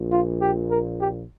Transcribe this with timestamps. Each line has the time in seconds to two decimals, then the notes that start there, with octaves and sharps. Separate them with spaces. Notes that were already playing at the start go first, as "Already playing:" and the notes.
Already playing: A#1 A#2
0.11 F4
0.41 G4
0.70 A#4
0.99 G4